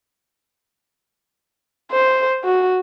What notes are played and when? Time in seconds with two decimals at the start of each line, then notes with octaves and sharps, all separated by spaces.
1.91 C5
2.44 F#4